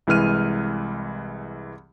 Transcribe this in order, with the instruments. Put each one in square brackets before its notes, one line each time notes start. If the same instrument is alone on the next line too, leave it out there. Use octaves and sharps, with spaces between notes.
[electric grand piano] C2 E3 G#3 F6 D#7